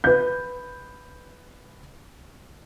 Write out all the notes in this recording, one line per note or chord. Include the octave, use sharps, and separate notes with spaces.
B4 G6